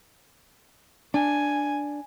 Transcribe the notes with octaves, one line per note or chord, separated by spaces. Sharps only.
D4 G#5